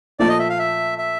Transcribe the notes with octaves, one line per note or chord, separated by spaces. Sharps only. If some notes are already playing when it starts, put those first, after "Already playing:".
A#2 F3 A3 D5
D#5
E5
F5
E5
E5